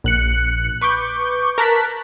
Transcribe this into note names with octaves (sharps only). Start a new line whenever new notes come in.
A#1 F#6 C#7
B4 C#6 D6 G6
A#4 A5 F#6 B6